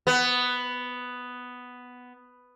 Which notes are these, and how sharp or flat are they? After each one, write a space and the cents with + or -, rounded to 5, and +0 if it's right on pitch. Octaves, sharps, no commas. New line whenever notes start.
B3 +5